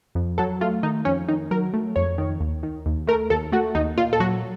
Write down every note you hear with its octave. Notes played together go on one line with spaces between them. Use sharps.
F2
F#3 A4
A3 F4
D#3 D#4
F2 C#4
D#3 D#4
F#3 A#4
A3
F2 C#5
D#3
D#2
D#3
D#2
A3 A#4
D#2 A4
A3 F#4
D#2 D#4
A#2 F4
A4
F#3 F#4